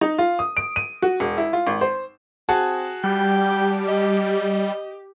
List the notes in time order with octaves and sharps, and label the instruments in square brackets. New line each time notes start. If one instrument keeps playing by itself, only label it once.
[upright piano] D#4
F4
D#6
D7
D#7
F#4
E1
E4
F4
G#1
C5
[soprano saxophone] C4 [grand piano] F#4 G#4 A5
[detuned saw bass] G3 [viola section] G4 [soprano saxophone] G5
[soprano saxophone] D#5